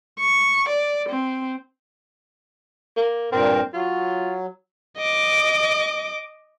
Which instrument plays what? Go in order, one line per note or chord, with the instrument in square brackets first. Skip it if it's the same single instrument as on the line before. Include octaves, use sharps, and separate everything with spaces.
[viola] C#6
D5
C4
[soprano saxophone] A#3
[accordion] G2 A#2 A#4 [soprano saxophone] C4
[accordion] F#3 [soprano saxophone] F4
[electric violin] D#5 D6